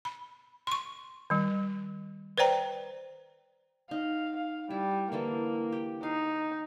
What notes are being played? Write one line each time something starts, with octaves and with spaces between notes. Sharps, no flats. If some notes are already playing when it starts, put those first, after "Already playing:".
B5
C6 C#6
D#3 G3
B4 C5 D5 G5 A#5
D#4 F5
F5
G3 E4
D3 E3 A#3 A4
G4
D#4 F5